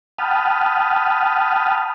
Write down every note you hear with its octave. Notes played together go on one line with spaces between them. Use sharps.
F#5 G5 A5 B5 D#6 F6